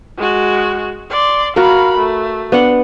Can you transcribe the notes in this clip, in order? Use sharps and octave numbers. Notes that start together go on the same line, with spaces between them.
G#3 F#4
D5 C6
F#4 A#4 F5 B5
A3
B3 D4 F#5